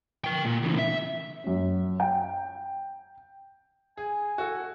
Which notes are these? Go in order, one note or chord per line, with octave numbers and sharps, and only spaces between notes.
A#4 G5
A#2
C#3 E3
E5
F#2 C#4
G5
G#4 G#5
F#4 A4